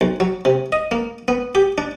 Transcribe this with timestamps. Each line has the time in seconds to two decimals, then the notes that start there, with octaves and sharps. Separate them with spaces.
0.01 B1
0.20 F#3
0.45 C3
0.72 D#5
0.91 A#3
1.28 B3
1.55 G4
1.78 D4